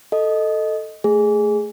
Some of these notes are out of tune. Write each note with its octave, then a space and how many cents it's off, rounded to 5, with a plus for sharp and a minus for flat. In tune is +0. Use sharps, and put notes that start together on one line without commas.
A4 +0 D#5 +0
A3 +0 G#4 +0